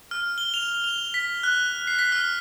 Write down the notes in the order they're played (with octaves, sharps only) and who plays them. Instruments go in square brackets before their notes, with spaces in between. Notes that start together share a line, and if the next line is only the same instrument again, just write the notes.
[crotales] F6
G7
F7
F7
B6
F#6
C7
B6
F6